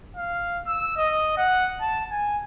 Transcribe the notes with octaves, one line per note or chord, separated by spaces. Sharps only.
F5
E6
D#5
F#5
A5
G#5